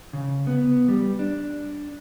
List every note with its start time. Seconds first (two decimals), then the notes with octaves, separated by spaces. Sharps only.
0.13 C#3
0.47 B3
0.89 G3
1.19 D4